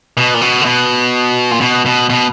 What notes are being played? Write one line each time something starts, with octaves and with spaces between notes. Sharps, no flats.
B2
A#2
B2
D3
B2
A#2
B2
B2
B2